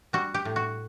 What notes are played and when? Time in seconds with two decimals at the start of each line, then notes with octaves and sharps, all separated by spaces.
0.13 G3 F#4
0.34 G4
0.45 A2
0.56 F#4